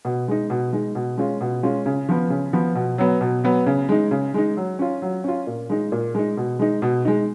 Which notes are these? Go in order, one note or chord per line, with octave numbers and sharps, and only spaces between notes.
B2
G#3 D#4
B2
G#3 D#4
B2
G#3 C#4 F4
B2
G#3 C#4 F4
C#3
F3 B3
C#3
F3 B3
B2
F#3 B3
B2
F#3 B3
C#3
G#3 D#4
C#3
G#3 D#4
F#3
C#4 F4
F#3
C#4 F4
A#2
G#3 D#4
A#2
G#3 D#4
B2
G#3 D#4
B2
G#3 D#4